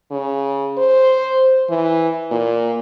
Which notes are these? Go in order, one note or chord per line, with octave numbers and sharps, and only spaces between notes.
C#3
C5
E3
A#2